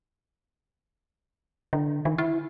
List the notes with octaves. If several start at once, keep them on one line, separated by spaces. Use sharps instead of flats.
D3
D#3
E4